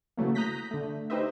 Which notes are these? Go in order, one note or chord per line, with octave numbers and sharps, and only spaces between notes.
C#3 E3 F#3 A3 A#3
A#5 D#6 F#6 G6 A#6 B6
D3 A3
D#4 G4 B4 C5 D#5 E5